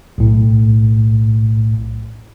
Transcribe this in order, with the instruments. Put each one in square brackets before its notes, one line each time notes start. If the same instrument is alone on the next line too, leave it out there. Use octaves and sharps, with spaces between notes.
[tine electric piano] B1 A2